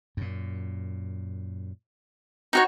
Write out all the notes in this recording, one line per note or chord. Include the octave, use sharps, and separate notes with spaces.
F#2 A#2
D#4 F#4 C#5